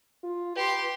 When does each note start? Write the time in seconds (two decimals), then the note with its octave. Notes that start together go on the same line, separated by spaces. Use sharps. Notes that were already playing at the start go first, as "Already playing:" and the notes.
0.23 F4
0.56 G4 B4 C6